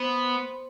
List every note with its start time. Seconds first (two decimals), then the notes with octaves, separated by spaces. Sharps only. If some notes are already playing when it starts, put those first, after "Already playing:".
Already playing: B3 C5